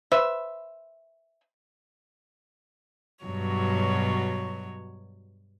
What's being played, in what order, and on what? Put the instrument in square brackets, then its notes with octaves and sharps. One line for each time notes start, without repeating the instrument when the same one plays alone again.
[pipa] B4 C5 E5
[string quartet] G2 B2 F#3 C#5